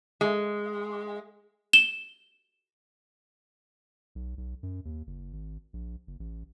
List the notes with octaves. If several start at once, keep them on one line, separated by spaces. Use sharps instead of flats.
G#3
E7 G7
B1
B1
F#2
D#2
F#1
G#1
A#1
F#1
A1